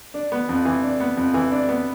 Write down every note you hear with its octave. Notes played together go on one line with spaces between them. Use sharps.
D4
B3
F2
E3
D4
B3
F2
E3
D4
B3